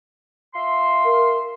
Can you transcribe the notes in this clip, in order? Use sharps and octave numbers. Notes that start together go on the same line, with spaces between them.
F4 E5 C6
A#4